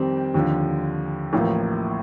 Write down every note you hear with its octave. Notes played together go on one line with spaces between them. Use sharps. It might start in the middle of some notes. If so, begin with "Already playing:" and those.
Already playing: F2 D#3 G3 C4 G4
D#2 D3 F3
A1 A2 F3 A#3